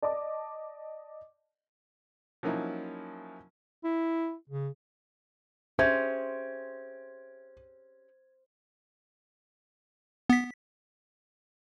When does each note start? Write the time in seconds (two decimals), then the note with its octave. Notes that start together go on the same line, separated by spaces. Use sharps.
0.02 D5 D#5 A5 D6
2.43 F3 F#3 A#3 C#4 D#4 E4
3.84 E4
4.50 C#3
5.79 C#4 G4 G#4 C5 E5 G#6
10.30 B3 B6